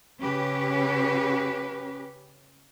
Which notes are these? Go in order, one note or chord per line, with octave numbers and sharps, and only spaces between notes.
C#3 C#4 G4 B4